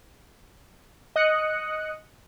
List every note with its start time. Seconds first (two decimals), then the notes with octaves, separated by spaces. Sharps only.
1.16 D#5 D#6 F#6 C#7